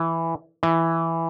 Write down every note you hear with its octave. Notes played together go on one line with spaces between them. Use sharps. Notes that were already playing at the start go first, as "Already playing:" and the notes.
Already playing: E3
E3